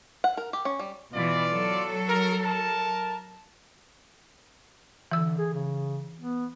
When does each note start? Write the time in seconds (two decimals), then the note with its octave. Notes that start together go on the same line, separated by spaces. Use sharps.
0.24 F#5
0.37 A#4
0.53 G4
0.65 C#4
0.79 G3
1.14 B2 E3 F4 D5
1.52 F#3 A4
2.08 A#4
2.43 A#4 A5
5.12 D3 E3 E6
5.38 G#4
5.54 C#3
6.20 B3